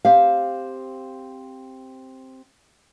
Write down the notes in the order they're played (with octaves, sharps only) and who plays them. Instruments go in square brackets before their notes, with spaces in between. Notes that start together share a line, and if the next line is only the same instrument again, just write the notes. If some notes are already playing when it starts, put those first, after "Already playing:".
[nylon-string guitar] C4 G4 F5